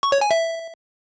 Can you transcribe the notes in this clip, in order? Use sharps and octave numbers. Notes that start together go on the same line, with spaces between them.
C#6
C#5
G#5
E5